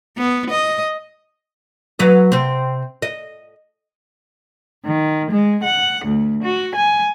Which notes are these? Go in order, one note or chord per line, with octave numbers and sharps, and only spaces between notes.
B3
D#5
F#3 B4 D#5
C3 C4
D#5
D#3
G#3
F#5
D2
F#4
G#5